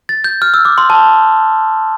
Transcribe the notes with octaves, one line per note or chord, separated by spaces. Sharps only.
A6
G6
F6
E6
D6
C6
A5